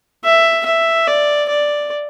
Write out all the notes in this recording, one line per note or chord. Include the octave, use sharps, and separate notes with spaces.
E5
E5
D5
D5